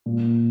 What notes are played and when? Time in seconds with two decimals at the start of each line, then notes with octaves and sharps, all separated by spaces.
0.06 A#2